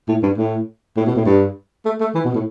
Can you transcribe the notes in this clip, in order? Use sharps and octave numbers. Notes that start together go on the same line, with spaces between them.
A2
G2
A2
A2
B2
A2
G2
A3
A3
E3
B2
A2